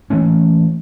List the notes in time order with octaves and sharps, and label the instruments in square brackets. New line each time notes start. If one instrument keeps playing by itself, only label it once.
[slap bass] E3 A3 A#3 C#4